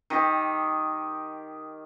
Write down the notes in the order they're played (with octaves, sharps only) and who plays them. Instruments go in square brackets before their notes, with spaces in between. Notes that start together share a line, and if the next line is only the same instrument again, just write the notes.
[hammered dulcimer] D#3 G4 D#5